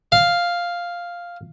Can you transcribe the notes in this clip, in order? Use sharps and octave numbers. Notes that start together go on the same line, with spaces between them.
F5